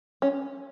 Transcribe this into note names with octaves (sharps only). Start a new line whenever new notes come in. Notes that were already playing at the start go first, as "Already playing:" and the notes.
C#4